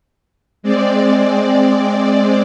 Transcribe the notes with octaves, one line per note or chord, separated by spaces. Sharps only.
G#3 C4 D5